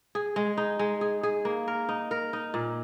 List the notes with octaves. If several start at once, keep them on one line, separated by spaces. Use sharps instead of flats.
G#4
G#3
D#4
G#3
G#4
G#4
A#3
A#4
D#4
A#4
D#4
A#2